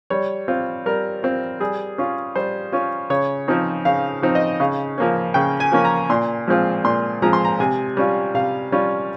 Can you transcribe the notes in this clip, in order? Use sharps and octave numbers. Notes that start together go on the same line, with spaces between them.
G3 C#5
C4 F4
G3 A#4
C4 F4
G3 G#4
C#4 F4
G3 C5
C#4 F4
C#3 C#5
F3 C4 D#4
C#3 F5
F3 C4 D#4
D#5
C#3 F5
F3 A#3 C#4
C#3 G5
G#5
F3 A#3 C#4
A#5
A#2 C6
F3 G#3 C4 F4
A#2 C6
F3 G#3 C4 F4 A#5
C6
A#5
C3 G#5
G3 C#4 F4
C3 F5
G3 C#4 F4